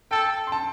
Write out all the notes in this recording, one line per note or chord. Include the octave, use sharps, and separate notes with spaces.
A4 G5
C6
A5